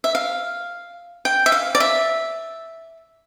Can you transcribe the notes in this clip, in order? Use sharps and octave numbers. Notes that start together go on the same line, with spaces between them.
E5
F5
G5
E5
F5
D5
E5